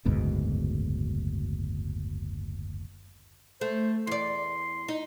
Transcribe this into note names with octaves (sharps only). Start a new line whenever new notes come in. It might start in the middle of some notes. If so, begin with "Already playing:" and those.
F#1 D2 G#2 B2
A3 C5
E2 D5 C6
D#4